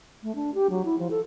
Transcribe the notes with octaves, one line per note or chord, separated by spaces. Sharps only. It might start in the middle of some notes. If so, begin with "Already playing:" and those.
A3
D4
G4
F#3
E4
F3
A4